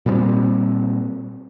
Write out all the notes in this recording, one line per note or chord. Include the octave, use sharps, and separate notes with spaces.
A#2 G3 G#3 C4